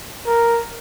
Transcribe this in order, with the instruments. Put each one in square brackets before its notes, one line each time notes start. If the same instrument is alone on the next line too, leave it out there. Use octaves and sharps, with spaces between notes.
[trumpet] A#4